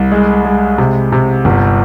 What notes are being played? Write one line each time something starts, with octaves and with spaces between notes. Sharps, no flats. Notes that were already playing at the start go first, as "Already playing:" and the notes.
Already playing: C2
G#3
G#3
C3
C3
G1